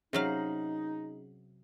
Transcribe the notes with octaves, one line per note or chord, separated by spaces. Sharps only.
C3 F#3 C#4 D#4 G#4 F5